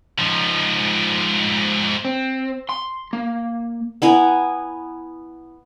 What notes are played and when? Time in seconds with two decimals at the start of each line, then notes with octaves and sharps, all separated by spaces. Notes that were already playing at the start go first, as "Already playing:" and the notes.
0.19 G#2 F3
2.05 C4
2.69 C6
3.13 A#3
4.02 B3 E4 G#5 A#5